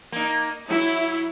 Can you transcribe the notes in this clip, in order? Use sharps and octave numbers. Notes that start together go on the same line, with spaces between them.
A#3 D#4
F#3 E4